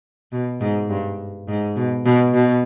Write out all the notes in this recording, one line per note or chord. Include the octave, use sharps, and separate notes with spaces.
B2
G#2
G2
G#2
B2
B2
B2